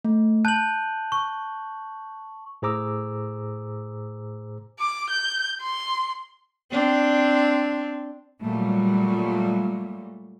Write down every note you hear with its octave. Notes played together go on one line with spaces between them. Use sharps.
A3
A5 F#6 G6 F#7
C#6
A2 G#4 C5 A#5 D6 E6
D6
G6
C6
C4 D4
A#2 F#3 G3 A3